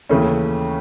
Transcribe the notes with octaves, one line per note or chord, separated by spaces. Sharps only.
D#2 C#3 E3 A3 C#4